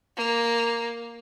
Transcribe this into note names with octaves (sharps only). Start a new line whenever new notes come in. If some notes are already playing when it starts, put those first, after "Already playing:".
A#3